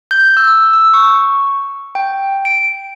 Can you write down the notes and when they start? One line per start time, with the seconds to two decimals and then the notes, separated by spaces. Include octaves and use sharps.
0.11 G6
0.37 E6
0.73 E6
0.94 C#6
1.95 G5
2.45 D7